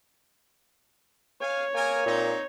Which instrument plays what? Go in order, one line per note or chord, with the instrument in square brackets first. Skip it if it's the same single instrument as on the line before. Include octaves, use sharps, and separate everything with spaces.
[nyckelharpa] C#5 [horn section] F5 G#5
[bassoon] A#3 [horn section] G#4 A#4 G#5
[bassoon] A#2 [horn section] C4 D#4